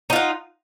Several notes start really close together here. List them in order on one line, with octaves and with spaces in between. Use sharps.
D#4 F4 F#5